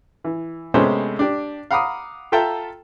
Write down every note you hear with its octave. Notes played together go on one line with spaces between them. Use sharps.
E3
C3 G#3 A3 B3 C#4 C5
D4 G4
F5 F#5 A#5 B5 D6 D#6
F4 A4 E5 G5 A5 A#5